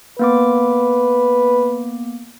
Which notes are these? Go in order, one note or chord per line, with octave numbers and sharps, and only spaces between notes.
A#3 B3 B4 D6